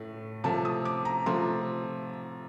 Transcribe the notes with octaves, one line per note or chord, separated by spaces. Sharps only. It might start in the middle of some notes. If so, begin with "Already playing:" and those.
Already playing: A2 A3
C3 F3 A3 A5
D#6
D6
A#5
C3 F3 A3 C6